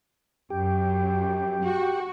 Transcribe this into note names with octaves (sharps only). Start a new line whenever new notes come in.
F#2 G4
F#4